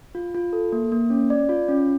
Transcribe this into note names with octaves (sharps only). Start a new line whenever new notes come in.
F4
F4
A4
A#3
A#3
C#4
D5
F4
C#4